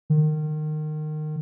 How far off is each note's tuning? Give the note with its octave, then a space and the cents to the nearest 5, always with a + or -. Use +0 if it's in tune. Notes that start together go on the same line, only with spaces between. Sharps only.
D#3 -25